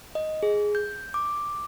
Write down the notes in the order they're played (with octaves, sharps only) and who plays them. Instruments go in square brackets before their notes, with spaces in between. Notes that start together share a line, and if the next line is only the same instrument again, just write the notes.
[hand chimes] D#5
G#4
G6
D6